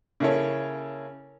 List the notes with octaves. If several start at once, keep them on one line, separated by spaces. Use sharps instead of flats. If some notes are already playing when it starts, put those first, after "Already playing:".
C#3 A#3 E4 A4 C#5